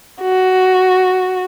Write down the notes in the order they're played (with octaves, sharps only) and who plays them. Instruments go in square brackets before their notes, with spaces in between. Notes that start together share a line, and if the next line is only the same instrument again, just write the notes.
[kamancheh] F#4